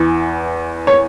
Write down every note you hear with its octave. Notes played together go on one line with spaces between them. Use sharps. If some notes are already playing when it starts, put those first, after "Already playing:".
Already playing: E2 E3
C#5